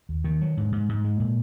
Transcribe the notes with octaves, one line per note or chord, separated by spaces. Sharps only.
D#2
D#3
F#3
G#2
G#2
G#2
G#3
A#2